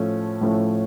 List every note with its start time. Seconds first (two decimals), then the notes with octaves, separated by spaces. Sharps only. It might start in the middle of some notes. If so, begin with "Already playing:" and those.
Already playing: A2 F3 A3 C#4
0.41 A2 F3 A3 C#4